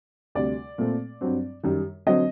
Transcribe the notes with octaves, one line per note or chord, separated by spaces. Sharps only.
D2 C3 G3 D5
A#2 A3 C4
G2 F#3 C4
F#2 D#3 G3
D3 F#3 C4 D#5